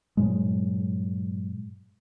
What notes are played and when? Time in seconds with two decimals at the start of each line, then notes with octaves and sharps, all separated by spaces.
0.17 G2 A#2 F#3 G#3